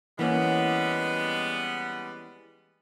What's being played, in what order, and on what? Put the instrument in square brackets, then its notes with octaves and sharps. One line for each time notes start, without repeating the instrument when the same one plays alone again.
[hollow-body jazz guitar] E3 A#3 C#4 [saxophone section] G3 G#3 B3